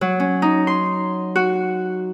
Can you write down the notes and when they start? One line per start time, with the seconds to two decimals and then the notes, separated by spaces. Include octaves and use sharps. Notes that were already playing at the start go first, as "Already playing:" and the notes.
0.01 F#3
0.20 C#4
0.42 D#4
0.67 C6
1.36 F#4